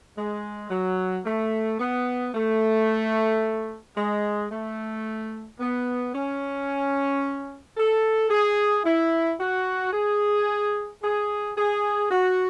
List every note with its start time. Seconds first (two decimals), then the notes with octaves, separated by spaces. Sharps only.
0.16 G#3
0.70 F#3
1.25 A3
1.79 B3
2.33 A3
3.96 G#3
4.50 A3
5.59 B3
6.13 C#4
7.77 A4
8.30 G#4
8.84 E4
9.40 F#4
9.93 G#4
11.02 G#4
11.56 G#4
12.11 F#4